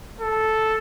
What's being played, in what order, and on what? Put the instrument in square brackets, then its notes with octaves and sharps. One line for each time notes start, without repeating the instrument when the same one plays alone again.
[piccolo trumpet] A4